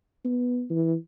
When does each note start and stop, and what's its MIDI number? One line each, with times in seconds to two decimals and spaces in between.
0.25 0.65 59
0.70 0.95 52